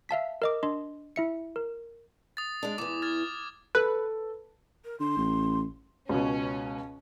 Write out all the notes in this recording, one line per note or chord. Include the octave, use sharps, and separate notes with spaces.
E5 F5 A5 B6
A#4 D#5 D6
D4 D#5 C6
E4 E5 C#7
A#4
D#6 A6
G#3 D4
E2 E3 D6
F6 G#6 A6
A4 B4
A#4
D3 C6
A1
C#2 B2 C#4